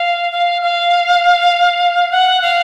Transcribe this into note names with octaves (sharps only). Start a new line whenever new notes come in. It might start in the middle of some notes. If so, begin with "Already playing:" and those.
Already playing: F5
F5
F5
F#5
F5